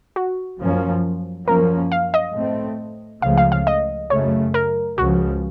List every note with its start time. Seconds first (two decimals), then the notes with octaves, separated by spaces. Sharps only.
0.16 F#4
0.60 F#2 F3 A#3 C#4
1.48 F#2 F3 A#3 C#4 A#4
1.92 F5
2.14 D#5
2.35 A2 A3 C4
3.22 C#2 C#3 F3 A3 F5
3.38 F5
3.52 F5
3.67 D#5
4.10 F#2 C#3 A3 C#5
4.54 A#4
4.98 C#2 C#3 F3 F#4